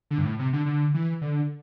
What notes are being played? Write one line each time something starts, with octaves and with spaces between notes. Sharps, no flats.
D3
G2
A2
C3
D3
D3
E3
D3